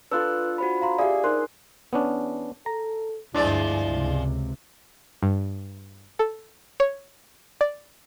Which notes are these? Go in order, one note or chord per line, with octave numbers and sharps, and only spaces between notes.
D4 F4 A4 B4 E6 F#6
F#4 C5 B5
F5 A#5 C6
G4 G#4 D5 E5 F5
D#4 A#4 C5 C6 F#6
E2 B3 C#4 D4
A4 A#5
D2 G2 F3 G#3 D4 E4 D5
C#2 C3
G2
A4
C#5
D5